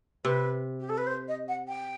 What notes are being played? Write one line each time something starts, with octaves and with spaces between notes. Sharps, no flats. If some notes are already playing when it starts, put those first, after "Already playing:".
C3 B4
G4
A4
B4
C5
D#5
F#5
G5